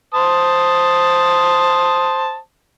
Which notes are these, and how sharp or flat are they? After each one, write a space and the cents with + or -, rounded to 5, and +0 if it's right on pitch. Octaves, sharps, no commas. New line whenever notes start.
C5 +0 A5 +0 D#6 +0